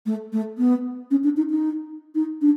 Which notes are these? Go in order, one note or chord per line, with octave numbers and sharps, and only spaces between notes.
A3
A3
B3
C#4
D4
D#4
D#4
D#4
D4